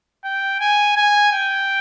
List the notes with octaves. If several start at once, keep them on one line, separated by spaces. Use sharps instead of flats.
G5
G#5
G#5
G5